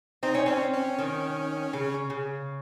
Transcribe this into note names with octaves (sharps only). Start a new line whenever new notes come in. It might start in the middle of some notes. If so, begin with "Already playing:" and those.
C4 D#4
C#4
C4 C#4
C#4
D#3
C#3
C#3